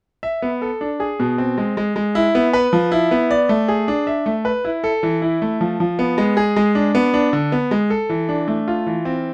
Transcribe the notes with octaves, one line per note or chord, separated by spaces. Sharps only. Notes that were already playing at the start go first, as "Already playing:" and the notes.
E5
B3
A4
D4
G#4
B2
C4
G#3
G#3
G#3
E4
B3
B4
F3
E4
B3
D5
A3
G#4
D4
E5
A3
B4
E4
A4
E3
E4
A3
F3
F3
B3
G#3
G#4
G#3
D4
B3
D4
D3
B3
G#3
A4
E3
D4
A3
F4
E3
C4